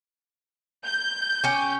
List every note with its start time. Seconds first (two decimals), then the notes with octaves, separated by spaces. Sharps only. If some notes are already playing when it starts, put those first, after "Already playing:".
0.85 G6
1.44 C#4 G4